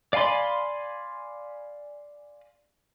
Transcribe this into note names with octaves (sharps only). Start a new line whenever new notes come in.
D5 F5 G#5 B5 C6